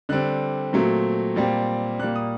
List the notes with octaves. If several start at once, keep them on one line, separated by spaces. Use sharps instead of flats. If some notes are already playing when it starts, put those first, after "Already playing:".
D3 G3 C4 F#6
A#2 F#3 A3 C4
A#2 G3 C4
A#2 G3 A#3 F#6
D#6